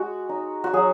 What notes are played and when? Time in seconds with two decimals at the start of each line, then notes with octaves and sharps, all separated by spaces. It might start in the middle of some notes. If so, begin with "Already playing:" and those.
Already playing: G#3 F#4
0.29 D#4
0.64 F#4
0.73 F#3 G#4